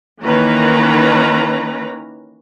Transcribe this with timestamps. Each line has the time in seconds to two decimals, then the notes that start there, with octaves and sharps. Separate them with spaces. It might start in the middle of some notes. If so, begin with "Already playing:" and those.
0.22 D#3 E3 A#3 C#4 B4 A#5